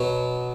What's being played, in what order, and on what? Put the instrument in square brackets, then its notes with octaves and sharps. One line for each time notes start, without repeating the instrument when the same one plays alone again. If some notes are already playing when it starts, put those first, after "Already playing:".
Already playing: [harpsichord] B2 F#3 B3